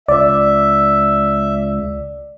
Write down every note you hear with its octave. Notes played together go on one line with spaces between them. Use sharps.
C#2 D5 E5